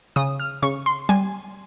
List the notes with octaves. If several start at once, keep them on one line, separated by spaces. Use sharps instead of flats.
C#3 D#6
F6
C#3 C#6
C6
G3 G#5